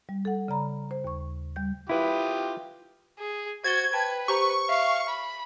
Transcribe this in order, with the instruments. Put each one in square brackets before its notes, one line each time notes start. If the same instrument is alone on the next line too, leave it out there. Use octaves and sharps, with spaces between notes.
[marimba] G3
A4 F#5
C#3 D5 A#5 B5
C5
D#2 C#6
G3 G6
[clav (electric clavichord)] E4 B4 [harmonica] F4 G4 D#6
[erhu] G#4
[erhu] F#4 [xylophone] C5 A6 G7 [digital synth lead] G#6
[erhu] B4 [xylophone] G5 A5
[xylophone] G4 C5 A#5 [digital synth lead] C#6
[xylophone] E5 [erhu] F5
[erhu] B5